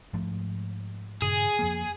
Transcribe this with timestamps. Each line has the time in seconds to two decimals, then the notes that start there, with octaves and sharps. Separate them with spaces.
0.13 G#2 F3 A3
1.22 G2 A#2 C#3 G#4
1.59 F2 F3 A#3